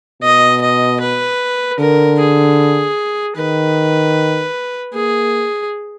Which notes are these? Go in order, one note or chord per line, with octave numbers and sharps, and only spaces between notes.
B2 D#5
D#5
B4
D3 A#4
G#4
D#3 B4
A#3 G#4